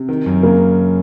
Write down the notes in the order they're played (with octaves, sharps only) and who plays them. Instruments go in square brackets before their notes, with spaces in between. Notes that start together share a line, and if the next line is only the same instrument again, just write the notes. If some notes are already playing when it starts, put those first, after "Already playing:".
Already playing: [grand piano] C3
D#3
F#2
[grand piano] C#3 [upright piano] A#3